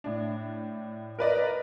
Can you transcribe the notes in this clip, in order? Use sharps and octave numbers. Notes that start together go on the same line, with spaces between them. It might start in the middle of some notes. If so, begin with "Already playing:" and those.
A2 D4
A#4 B4 D5 D#5